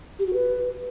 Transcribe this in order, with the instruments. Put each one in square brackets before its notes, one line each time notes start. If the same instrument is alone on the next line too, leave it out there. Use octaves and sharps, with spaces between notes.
[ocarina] G4
F#4
B4